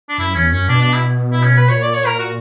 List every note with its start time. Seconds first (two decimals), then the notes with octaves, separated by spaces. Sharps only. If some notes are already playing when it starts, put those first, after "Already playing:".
0.09 D4
0.18 F#2 E4
0.35 E2 C#4
0.52 F#2 C#4
0.68 B2 D4
0.81 D4
0.93 E4
1.32 E4
1.44 C#4
1.57 B4
1.69 A#2 C#5
1.82 D5
1.94 C#5
2.07 A#4
2.19 F#4